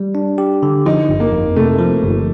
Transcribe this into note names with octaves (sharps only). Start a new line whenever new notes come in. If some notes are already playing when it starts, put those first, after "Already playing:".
Already playing: G3
D4
G4
D3
F3 D#4
G1
A#3
F2
C3 A3
F3
G1